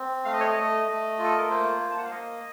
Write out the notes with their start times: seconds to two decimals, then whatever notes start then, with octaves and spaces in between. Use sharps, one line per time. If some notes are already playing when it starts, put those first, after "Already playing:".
Already playing: C4
0.25 A3 F5
0.33 D#5
0.40 C#5
0.48 D#5
0.57 A3
0.88 A3
1.18 F4
1.24 A4
1.37 A#4
1.49 A#3 C5
1.80 A#3
1.90 A5
1.98 F#5
2.05 F5
2.11 A#3 D#5